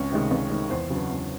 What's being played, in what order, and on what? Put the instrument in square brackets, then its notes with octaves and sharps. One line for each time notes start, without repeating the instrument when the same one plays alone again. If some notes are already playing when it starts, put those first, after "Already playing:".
Already playing: [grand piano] C#2 C#4 C#5
C3 D#3 G#3
C#2
C3 D#3 G#3
E2 C4 C5
C#3 F#3 B3 D4
E2